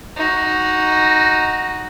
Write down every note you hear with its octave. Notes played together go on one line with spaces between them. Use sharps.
D#4 F#4